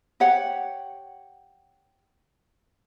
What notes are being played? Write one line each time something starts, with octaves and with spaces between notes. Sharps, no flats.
G4 C#5 F#5